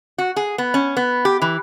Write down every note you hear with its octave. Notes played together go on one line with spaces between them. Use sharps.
F#4
G#4
B3
C#4
B3
G4
E3